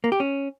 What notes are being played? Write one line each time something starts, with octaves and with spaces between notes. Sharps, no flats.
A#3
G4
C#4